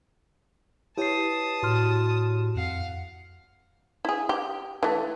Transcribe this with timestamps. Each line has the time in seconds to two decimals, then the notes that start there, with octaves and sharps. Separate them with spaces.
0.98 E4 G4 B4 C#5 A5 D#6 C7
1.63 A2 F#4 C6 F6
2.55 F2 F5 F#5
4.05 E4 G#4
4.29 G4
4.83 E3 A3